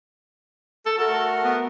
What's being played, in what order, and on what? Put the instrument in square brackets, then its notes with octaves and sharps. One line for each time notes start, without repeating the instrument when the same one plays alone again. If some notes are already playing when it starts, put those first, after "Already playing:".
[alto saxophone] A4
[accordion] A3 F#4 A#4 [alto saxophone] A4
[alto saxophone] B3